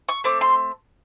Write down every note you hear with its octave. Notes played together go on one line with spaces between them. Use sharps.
C#6
A3 C4 D6
C6